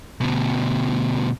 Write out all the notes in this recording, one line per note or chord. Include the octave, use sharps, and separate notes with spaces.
D2 B2